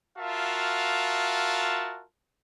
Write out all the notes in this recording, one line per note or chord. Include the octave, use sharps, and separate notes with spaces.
F4 F#4 A#4 E5 F5 A5